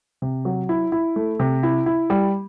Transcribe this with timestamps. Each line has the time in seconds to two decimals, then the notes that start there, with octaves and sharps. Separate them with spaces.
0.22 C3
0.45 F#3
0.69 E4
0.92 E4
1.16 A3
1.39 C3
1.63 E4
1.86 E4
2.10 G3